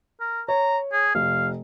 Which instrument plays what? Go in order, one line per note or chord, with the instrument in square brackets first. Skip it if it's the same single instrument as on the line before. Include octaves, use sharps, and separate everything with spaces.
[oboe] A#4
[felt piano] C#5 [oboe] A#5
[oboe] G#4
[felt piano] F1 [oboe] F5